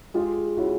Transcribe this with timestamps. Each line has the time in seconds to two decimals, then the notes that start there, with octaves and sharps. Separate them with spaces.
0.14 G#3 F4 G4
0.57 C#3 E4 F#4